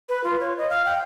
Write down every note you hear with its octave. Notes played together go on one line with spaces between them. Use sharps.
B4
F4
C#5
D#5
F5
G5